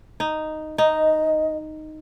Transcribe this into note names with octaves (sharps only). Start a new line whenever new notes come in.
D#4
D#4 D#5